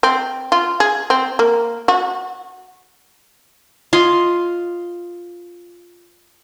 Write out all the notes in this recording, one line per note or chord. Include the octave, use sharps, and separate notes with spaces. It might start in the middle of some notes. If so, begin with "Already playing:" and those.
C4
F4
G#4
C4
A#3
F#4
F4 D#5 C6